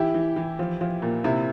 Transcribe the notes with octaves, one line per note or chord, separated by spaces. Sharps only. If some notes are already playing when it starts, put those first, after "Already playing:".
Already playing: E3 E4 G4
E3
E3
F3
F3
A#2
C3 E4